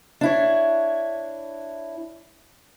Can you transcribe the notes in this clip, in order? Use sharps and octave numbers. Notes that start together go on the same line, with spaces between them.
D4 E4 C#5